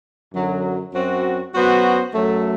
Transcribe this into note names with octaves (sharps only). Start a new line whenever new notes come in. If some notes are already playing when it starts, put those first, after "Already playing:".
F#2 D3 F#3
F#2 F#3 C4 F#4
F#2 F#3 B3 F#4 C5
F#2 F#3 A3